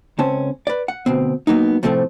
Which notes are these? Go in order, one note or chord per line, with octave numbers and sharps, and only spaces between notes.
C#2 C4 C#4 A5
B4 D5
F#5
D2 B2 C4
F#3 A#3 B3 D#4
A2 C3 F3 A3 C4 A4